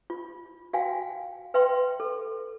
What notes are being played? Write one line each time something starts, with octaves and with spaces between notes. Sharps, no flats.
F4
F#4 E5 F5 G5 G#5
B4 E5 G5 C6
A4